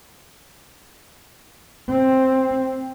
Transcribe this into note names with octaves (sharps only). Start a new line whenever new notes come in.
C4